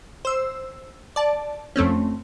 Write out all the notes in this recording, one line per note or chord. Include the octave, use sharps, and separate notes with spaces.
C5 E6
D5 A5
F2 A3 C4 C#4